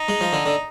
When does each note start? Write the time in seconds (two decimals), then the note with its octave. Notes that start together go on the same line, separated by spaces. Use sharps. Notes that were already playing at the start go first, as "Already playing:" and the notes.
Already playing: D#4
0.08 G#3
0.21 F3
0.33 D3
0.46 D3